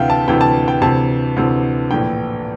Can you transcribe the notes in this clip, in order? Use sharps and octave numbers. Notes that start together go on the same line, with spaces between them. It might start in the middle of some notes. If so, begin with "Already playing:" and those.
Already playing: D2 C3 E3 E5 F5 G5
A5
D2 C3 E3 G5
A5
G5
D2 C3 E3 A5
D2 C3 E3
A#1 A2 E3 G5